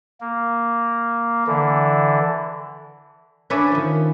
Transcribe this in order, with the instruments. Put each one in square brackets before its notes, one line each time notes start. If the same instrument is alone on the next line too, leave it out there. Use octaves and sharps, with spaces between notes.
[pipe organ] A#3
D3 E3
[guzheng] C#4 D4 B4 D5 E5 G#5
D#3 F3